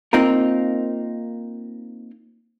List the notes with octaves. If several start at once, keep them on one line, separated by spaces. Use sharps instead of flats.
A#3 C4 D#4 F4 A#4